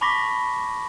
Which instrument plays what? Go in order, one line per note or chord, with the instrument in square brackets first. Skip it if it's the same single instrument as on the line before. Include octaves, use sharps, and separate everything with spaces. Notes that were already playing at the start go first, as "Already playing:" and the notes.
[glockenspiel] A5 B5 C#6 D6 A#6 B6